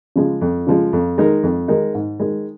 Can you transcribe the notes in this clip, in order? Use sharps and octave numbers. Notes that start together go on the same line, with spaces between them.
C#3 F3 G#3
F2
C#3 F3 G#3
F2
D#3 G#3 D#4 A#4
F2
D#3 G#3 D#4 A#4
G#2
D#3 G#3